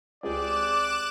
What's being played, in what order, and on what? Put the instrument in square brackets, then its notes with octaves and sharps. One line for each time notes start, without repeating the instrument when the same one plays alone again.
[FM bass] C#2 [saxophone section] C3 G4 G#4 [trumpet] D5 [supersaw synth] D6 F#6 E7